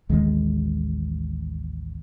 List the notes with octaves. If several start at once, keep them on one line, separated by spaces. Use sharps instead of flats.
A1 D#2 D#3 G#3